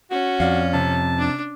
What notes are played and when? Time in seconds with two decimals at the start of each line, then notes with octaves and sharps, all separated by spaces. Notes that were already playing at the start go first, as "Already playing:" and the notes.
0.11 C#4 F#4
0.40 F2 D5 F5
0.73 C3 A5
1.19 D4